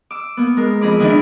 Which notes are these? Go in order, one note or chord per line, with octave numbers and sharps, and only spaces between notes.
D6 E6
A#3 B3
G#3 A#4
F2 C4 G#4 B5 D6
D#3 E3 D4 E4